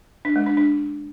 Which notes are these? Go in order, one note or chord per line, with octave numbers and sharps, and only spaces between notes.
D4
G#3
D4
D4